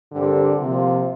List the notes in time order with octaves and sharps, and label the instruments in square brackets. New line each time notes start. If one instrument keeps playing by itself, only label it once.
[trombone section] G2 G3 C4 G4 A#4 [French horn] D3
[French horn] C3 [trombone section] F3 A#3 F4